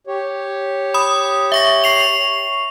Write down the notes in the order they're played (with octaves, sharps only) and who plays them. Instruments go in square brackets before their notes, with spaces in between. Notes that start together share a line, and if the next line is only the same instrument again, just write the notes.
[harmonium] G4 C#5
[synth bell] B5 D#6
E5 C#6 A#6
C#6 C7 F7